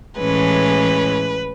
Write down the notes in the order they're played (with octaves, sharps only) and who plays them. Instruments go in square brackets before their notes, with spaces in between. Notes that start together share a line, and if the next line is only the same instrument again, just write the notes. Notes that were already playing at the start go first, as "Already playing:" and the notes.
[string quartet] A2 E3 G#3 C#4 B4